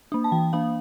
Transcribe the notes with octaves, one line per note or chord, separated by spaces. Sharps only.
A#3 D4
A5
E3 G5
A#3 D4 F5